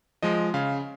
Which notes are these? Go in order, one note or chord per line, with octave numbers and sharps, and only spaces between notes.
F3 G#3 D#5
C#3 F5